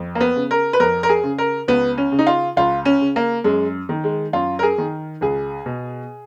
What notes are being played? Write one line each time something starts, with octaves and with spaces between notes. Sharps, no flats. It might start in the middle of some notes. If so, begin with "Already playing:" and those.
Already playing: F2
A#3
B3
C#3
A#4
B4
F2 A#4
A#4
G#4
C#3
A#4
C#2 B3
C#4
C#3
D#4
F4
C#2 F4
C#4
C#3
A#3
F#2 G#3
D#3
G#3
F#2 F4
A#4
G#4
D#3
C#2 G#4
B2